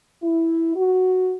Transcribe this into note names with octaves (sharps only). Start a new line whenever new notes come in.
E4
F#4